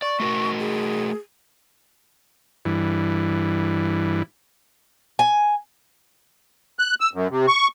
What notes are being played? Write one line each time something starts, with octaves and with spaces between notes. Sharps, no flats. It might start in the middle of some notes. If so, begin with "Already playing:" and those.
D5 C#6
A3 F#4 A#4
G#4
G2 E3
G#5
F#6
E6
F#2
C3
C#6